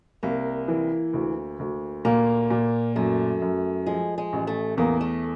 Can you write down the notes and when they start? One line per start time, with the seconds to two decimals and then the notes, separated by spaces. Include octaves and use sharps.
0.23 C2 A#3
0.68 E3
1.13 D2
1.59 D2
2.05 A#2 A#3
2.50 A#2
2.96 F#2 A3
3.42 F#2
3.86 F3 G#3
4.18 G#3
4.33 A1
4.47 A3
4.77 E2 A#3
5.01 A3